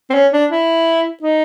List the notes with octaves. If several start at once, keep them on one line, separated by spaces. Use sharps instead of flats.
C4
C#4
D4
E4
D#4